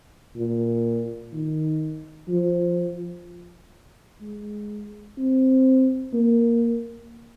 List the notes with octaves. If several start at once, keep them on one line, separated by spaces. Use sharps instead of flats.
A#2
D#3
F3
G#3
C4
A#3